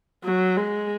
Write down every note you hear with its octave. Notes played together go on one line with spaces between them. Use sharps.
F#3
G#3